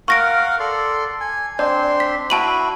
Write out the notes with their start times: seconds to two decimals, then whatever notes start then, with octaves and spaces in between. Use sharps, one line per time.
0.08 A#4 F5 F#5 C#6 A#6 D7
0.60 A4 D5 C6
1.21 G#5
1.59 C4 D4 D5 C6
2.00 B6
2.30 E4 F#4 A5 D#7 F#7